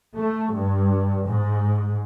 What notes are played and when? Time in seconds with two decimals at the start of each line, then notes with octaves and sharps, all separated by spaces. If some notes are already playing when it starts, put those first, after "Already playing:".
0.15 A3
0.53 G2
1.27 G#2